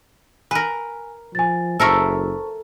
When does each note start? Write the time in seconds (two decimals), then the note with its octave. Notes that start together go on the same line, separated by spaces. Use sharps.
0.51 A#4 B4 G#5
1.35 F3 G#5 A6
1.80 F#1 A4 A#4 C5 E5 A5 C#6